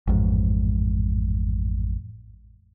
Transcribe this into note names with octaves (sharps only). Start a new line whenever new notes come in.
A1 F2 G#2